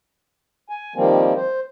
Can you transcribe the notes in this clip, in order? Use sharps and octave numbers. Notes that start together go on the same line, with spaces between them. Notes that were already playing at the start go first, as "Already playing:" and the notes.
G#5
D#3 F3 G3 A#3 C4
C5